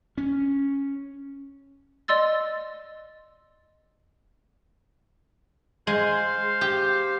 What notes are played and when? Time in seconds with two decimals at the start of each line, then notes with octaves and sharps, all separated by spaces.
0.18 C#4
2.08 D5 D#5 C6 E6 A6
5.87 G#3 C5 F5
6.61 G4